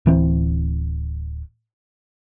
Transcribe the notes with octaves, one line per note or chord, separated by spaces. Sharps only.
D1 E3 C4